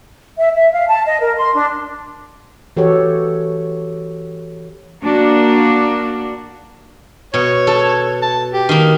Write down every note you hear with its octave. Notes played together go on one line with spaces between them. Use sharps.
E5
E5
F5
A5
D#5
A#4
C6
D4
E3 F#4 G4 A4 C#5
A#3 D4 F#4
B2 C#5
A4
A5
G4
D#3 A#3